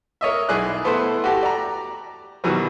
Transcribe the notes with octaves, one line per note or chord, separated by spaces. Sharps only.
A#4 C#5 D#5 E5
B1 E4 G#4 D5 D#5 F#6
A3 B3 E4 A4 C5
F#4 G4 A4
D5 A#5
B2 D#3 E3 F#3 G3